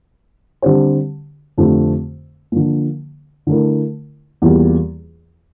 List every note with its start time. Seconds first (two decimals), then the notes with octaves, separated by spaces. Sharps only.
0.62 D3 G3 C4 G4 C5
1.58 F2 D3 A3 C4 G4
2.52 D3 F3 A#3
3.47 D3 A3 E4 A#4
4.42 E2 E3 G3 A#3 F4